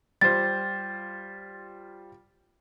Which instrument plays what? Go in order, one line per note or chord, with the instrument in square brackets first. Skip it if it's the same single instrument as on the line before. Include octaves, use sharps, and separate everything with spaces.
[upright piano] G3 F4 C5 [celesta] A6